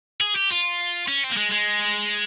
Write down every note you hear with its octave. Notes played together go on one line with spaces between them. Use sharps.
G#4
G4
F4
C#4
C4
A#3
G#3
G#3